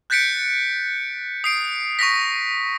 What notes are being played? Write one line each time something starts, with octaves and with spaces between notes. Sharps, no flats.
F#6 G6 A6 B6 C#7 D7
D#6 C7 D7
C#6 D#6 A#6 B6